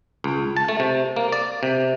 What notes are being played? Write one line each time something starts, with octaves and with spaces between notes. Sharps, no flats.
C#2
A5
A3
C3
A#3
D5
C3